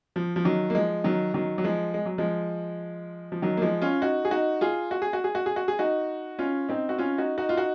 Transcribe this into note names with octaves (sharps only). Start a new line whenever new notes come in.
F3
F3
D#3 F#3
A#3
F3 G#3
D#3 F#3
D#3 F#3
F#3
F3 G#3
G#3
F#3
F3 G#3
F3
D#3 F#3
A#3
F3 G#3
C#4 F4
D#4 F#4
G#4
D#4 F#4
F4 G#4
F#4
G#4
F#4
G#4
F#4
G#4
F#4
G#4
D#4 F#4
C#4 F4
C4 D#4
F#4
C#4 F4
D#4 F#4
D#4 F#4
F4
D#4 F#4